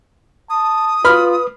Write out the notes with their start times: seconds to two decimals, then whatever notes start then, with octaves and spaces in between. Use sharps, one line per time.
0.50 A5 D#6
1.05 F4 B4 B5 F6